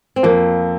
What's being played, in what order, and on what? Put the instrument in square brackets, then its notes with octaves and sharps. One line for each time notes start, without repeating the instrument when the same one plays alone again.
[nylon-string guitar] C4
[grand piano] F2 [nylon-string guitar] A#3